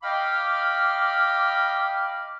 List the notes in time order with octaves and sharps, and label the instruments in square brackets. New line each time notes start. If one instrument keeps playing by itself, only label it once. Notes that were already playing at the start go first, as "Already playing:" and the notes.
[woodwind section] D#5 F5 G5 B5 D6 F6